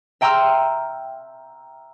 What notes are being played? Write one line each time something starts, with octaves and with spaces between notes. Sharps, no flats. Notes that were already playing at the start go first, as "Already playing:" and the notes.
E5 G5 A#5 C6 E6 F6